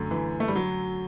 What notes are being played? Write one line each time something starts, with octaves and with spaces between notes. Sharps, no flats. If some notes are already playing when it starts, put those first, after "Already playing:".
Already playing: F#2 D3 A3
E3
A3
G3
F#3